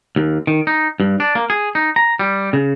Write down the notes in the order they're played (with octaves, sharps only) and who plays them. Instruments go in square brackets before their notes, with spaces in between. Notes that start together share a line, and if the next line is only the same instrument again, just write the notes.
[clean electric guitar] D#2
D#3
D#4
G2
D4
A#3
G#4
D#4
A#5
G3
C#3